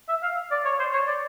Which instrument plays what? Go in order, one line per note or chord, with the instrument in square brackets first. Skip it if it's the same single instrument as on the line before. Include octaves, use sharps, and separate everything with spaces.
[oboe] E5
F5
D5
C#5
C5
C#5
D5